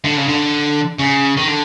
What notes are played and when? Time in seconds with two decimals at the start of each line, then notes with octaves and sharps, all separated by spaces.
0.04 D3
0.16 C#3
0.28 D3
1.00 C#3
1.38 D#3
1.48 D3